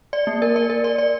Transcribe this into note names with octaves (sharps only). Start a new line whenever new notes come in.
D5
A#3
A#4
D5
A#4
D5
D5